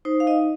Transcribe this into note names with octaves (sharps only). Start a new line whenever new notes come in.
D#4 C5
F5
D#4 D#5